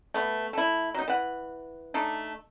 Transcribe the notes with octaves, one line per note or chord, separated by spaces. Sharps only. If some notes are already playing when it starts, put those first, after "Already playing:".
A3 B3
A3 E4
F#3 D#4
E3 F#5
A3 D4 D#4